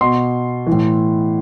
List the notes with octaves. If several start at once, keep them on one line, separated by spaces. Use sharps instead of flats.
B2 C6
E3
A2